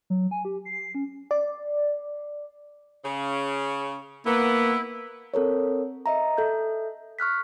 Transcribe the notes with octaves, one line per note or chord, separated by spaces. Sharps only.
F#3
G#5
G4
C7
C#4
D5
C#3
A#3 B3 E4
C4 A4 A#4 C#5
D#5 E5 A#5
A4 E5 G6
C#6 F6 F#6 B6